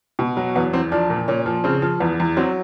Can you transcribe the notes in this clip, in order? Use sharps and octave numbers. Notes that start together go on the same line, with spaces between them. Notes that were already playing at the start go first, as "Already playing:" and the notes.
B2
F#3
E2 B3
E2 C4
F3 D4
A#2
A#2 C#4
F3
C#3 C4
F3
E2 B3
E2
F#3 C4